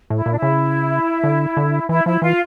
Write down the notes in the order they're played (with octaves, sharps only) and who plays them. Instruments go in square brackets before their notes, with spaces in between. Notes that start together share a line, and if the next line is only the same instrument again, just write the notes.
[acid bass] A2 [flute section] E4
[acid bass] A#2
[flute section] D4
E4
[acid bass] C#3
D3
D3
[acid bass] E3 [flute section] E4
[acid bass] F3 [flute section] E4
[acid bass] E3 [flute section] F4